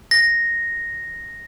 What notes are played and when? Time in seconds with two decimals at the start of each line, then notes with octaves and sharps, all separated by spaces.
0.11 A#6